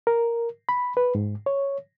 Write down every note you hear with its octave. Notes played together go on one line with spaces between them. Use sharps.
A#4
B5
B4
G#2
C#5